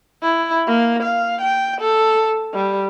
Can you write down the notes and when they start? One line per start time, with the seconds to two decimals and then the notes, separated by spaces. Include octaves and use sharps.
0.22 E4
0.67 A#3
1.03 F5
1.41 G5
1.81 A4
2.54 G3